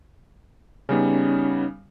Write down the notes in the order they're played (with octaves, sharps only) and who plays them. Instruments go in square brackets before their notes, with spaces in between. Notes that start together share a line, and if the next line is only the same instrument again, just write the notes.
[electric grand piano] C#3 G3 B3 [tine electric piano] C#4 D#4